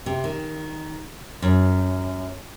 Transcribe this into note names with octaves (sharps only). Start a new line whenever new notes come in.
C3
D#3
F#2